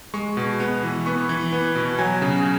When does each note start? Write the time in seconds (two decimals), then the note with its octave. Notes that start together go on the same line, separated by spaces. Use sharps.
0.14 G#3 C#6
0.37 B2
0.60 B3
0.83 E3
1.06 B3 C#6
1.29 E3
1.53 B3
1.75 B2
1.99 F#3 G#5
2.22 C#3